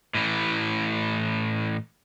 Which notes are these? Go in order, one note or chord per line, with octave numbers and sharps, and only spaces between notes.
A2 E3